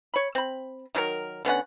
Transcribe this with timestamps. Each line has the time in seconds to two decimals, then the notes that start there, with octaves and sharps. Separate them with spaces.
0.14 C#5 B5
0.35 C4 B5
0.95 D#3 F#3 D4 A#4
1.45 D3 B3 C#4 F#5